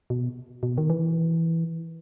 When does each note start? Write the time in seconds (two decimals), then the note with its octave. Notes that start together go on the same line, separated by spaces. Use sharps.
0.10 B2
0.63 B2
0.78 D#3
0.90 E3